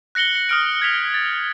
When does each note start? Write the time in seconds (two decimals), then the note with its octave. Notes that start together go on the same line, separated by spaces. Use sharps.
0.15 F#6 A#6 C#7 F#7 G7
0.35 C#7
0.49 D#6 F6 D7
0.82 G#6 B6 F7
1.14 A6